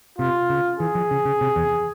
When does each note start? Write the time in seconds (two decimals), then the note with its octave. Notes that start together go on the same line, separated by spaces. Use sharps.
0.18 C3 F4
0.50 C#3
0.80 E3 G#4
0.95 F3
1.11 C#3
1.25 C#3
1.41 C3
1.56 E2